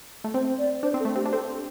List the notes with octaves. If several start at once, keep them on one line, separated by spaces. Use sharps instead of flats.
A3
C4 C5
D5
D4 C5
C4
A4
A3
C4 G4
D4
C4 A4